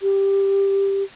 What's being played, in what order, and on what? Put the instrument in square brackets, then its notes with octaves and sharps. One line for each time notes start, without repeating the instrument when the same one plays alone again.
[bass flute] G4